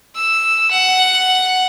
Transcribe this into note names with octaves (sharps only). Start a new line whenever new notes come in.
E6
F#5